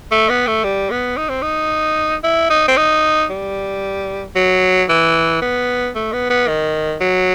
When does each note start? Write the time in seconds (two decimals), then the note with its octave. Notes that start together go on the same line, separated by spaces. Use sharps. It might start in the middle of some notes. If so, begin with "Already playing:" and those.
0.12 A3
0.29 B3
0.47 A3
0.64 G3
0.91 B3
1.17 D#4
1.29 C4
1.42 D#4
2.23 E4
2.50 D#4
2.68 C4
2.77 D#4
3.30 G3
4.35 F#3
4.89 E3
5.42 B3
5.95 A3
6.13 B3
6.30 B3
6.48 D#3
7.01 F#3